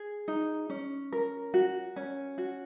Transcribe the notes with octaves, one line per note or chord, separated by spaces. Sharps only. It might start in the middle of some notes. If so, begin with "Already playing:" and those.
Already playing: G#4
D#4
C#4
A#4
F#4
C#4
F#4